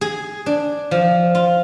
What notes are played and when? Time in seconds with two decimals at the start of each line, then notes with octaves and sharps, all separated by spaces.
0.01 G#4
0.46 D4
0.91 F3
1.35 F4